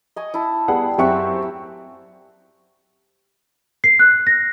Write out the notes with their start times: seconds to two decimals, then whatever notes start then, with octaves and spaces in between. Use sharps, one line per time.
0.16 D#5 G#5 C#6
0.34 E4 A5
0.68 G3 B3 G#4 F#5
0.98 F#2 C4 G4 E5 F#5 C#6
3.84 C7
3.99 F#6
4.27 A#6